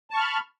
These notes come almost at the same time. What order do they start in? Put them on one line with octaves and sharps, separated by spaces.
A5 C#6 F6 B5